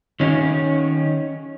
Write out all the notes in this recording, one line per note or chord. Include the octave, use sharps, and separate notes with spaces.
D#3 C#4